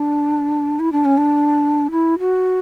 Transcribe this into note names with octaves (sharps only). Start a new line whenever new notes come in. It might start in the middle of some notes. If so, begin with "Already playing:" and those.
Already playing: D4
E4
D4
C#4
D4
E4
F#4